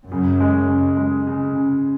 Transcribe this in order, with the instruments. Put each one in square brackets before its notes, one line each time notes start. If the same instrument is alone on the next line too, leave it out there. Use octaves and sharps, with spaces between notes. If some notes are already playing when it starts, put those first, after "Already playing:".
[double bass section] F#2 [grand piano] C#3
[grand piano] G#3
C#3
G#3
C#3
C#3